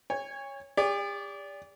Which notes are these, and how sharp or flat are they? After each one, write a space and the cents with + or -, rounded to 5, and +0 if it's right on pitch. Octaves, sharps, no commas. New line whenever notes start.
C#5 +0 G#5 -40
G4 +45 D5 -25